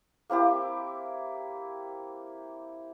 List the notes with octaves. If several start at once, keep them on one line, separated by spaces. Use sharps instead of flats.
A#3 C4 E4 G4